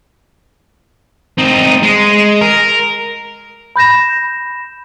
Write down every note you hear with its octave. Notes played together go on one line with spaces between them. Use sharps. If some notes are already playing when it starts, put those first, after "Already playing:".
C4 D#4
G#3
A#4
B5 G6 A#6 E7